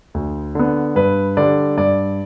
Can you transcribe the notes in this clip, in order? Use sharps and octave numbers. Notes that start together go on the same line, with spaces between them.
D2
D3 B3
G2 B4
D3 G3 D5
G2 D5